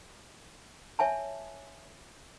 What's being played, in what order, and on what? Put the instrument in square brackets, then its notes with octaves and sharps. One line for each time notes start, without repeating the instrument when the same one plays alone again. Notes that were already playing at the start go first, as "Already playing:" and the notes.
[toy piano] C#5 E5 G#5 A5